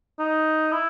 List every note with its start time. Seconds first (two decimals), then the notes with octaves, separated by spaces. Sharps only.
0.19 D#4
0.72 E4